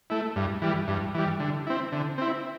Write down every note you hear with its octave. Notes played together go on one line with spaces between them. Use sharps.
A3 E4
G2
E3 G3
G2
E3 G3
D3
C4 E4
D3
C4 E4